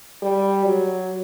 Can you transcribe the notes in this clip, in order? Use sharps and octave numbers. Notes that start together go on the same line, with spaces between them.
G3
F#3